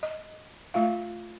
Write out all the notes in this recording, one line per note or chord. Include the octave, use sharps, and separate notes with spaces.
D#5
A3 F4 F5